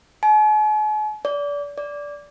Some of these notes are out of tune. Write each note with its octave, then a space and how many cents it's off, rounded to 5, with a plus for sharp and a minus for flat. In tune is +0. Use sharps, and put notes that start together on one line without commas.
G#5 +45
D5 -30
D5 -15